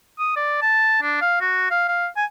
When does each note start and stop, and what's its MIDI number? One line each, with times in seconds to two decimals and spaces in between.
0.19 0.34 87
0.36 0.60 74
0.62 1.01 81
1.02 1.18 62
1.21 1.37 77
1.41 1.66 66
1.71 1.85 77
1.89 2.07 77
2.17 2.25 80